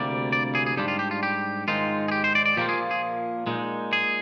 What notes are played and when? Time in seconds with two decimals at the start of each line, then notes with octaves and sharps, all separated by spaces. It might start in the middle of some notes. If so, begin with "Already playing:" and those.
Already playing: D2 C3 G3 A#3 D5
0.32 D5
0.55 G#4
0.66 G#4
0.77 G#2 G3 D4 F4 G4
0.88 F4
0.99 G4
1.11 F4
1.23 G4
1.68 G#2 D#3 G#3 D#4 F4
2.08 G#4
2.12 G4
2.24 C5
2.35 D5
2.46 D5
2.57 A#2 F3 A#3 F4 G4
2.69 G#4
2.91 G#4
3.47 A#2 G#3 D#4
3.93 G#4